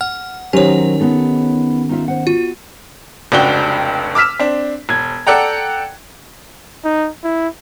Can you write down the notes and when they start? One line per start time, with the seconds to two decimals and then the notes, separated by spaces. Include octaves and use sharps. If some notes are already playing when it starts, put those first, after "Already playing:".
0.01 F#5 F6
0.53 D#3 F#3 C#4 G4 A#4 C5 C#5
1.00 B3 D#4 A4
1.89 D#4 F4 E5
2.08 C5 F#5
2.27 F4 F#4
3.32 F1 C#2 D4 F#4 G5 G7
4.15 D6 E6 F6 B6 E7
4.40 C4 D4
4.89 E1 G#6
5.27 A4 D5 F#5 G5 A#5
6.85 D#4
7.24 E4